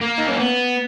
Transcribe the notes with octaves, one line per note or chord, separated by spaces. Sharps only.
A#3
D#4
C#4
B3